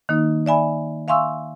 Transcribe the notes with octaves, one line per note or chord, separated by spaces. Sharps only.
D#3 A#3 D#4
D5 E5 G#5 B5
E5 F5 G#5 C6 C#6 E6